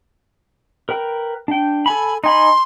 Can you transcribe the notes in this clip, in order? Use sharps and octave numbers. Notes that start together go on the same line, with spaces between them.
A#4 B4 G5
D4 G5
A4 G#5 B5
D#4 G#5 B5 C6